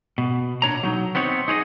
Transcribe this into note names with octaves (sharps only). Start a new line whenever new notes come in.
B2
A#2 D4 C#5 A#5
B1 F#3 D#4
B3 C4 D#4 C#5
D#4 G#4 C#5 D#5